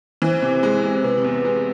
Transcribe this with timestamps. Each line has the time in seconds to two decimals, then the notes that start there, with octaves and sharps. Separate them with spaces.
0.22 E3 C5
0.42 C3
0.63 G#3
0.84 C3
1.03 C3 B4
1.24 E2
1.45 G#3